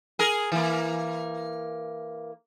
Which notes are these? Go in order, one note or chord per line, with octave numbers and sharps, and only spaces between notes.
G#4 A#4
E3 A#3